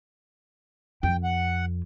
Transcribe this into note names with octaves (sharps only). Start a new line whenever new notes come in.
F2 G5
F#5